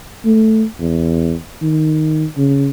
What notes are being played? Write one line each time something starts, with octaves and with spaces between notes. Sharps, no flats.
A3
E2
D#3
C#3